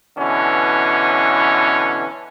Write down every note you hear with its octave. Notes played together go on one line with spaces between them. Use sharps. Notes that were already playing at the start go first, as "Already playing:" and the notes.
B2 D3 E3 C#4